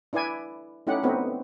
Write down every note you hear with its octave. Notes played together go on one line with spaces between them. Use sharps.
D4 E4 B4 D5 G#5
A3 C#4 D#4 E4 G4 F#5
A3 B3 C4 D#4 F#4 B4